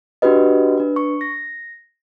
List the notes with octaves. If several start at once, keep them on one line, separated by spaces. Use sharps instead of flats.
D4 F#4 G4 B4 D#5
D4 B4
C#6
A#6